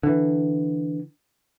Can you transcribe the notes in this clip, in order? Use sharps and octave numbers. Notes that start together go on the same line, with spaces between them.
D3 E3